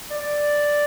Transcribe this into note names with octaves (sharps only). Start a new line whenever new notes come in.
D5